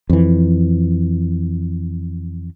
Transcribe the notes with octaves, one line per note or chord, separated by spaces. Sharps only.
F2 E3